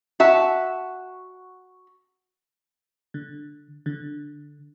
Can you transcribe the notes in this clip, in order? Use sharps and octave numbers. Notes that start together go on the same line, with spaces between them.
F#4 E5 A5
D3
D3